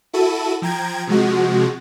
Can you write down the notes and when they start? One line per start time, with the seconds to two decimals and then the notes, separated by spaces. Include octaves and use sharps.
0.13 E4 F#4 A4 D#7
0.62 F3 G5 A#5 G#6
1.07 C3 F3 G#3 F#4